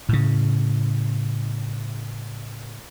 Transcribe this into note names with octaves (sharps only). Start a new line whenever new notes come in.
A2 C#3